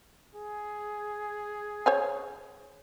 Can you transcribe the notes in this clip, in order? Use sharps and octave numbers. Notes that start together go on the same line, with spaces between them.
G#4
C5 C#5 G#5